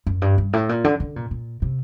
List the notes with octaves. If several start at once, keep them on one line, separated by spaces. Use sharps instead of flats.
F#2
G2
G2
A2
A#2
D3
D3
A#2
A#2
C3